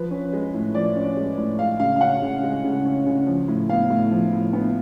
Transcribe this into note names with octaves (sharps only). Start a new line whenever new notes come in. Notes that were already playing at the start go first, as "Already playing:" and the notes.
Already playing: F3 B4
C#4
G#3
A2
F3 D5
C#4
G#3
A2
G#3 F5
C#3 F5
F5
C#4 F#5
C#3
G#3
C#3
C#4
C#3
F3
A2
B3 F5
A2
F3
A2
B3